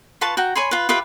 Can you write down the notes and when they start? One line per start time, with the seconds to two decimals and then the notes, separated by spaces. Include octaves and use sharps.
0.21 F4 B4 A5 C#6
0.37 F#4 G5 A#5
0.55 C#5 G#5 B5 C6
0.71 F4 B4
0.89 F4 G4 B4 E5